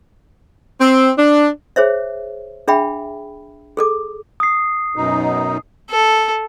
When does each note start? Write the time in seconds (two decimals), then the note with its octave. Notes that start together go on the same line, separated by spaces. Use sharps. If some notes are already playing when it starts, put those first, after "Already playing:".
0.80 C4
1.17 D4
1.76 G#4 C5 C#5 E5
2.68 D4 G#4 E5 G5 B5
3.77 G#4 A4 D6
4.40 D#6 C7
4.96 F#2 B2 D#4
5.90 A4